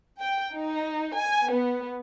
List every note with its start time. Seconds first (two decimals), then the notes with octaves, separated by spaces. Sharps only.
0.18 G5
0.55 D#4
1.16 G#5
1.49 B3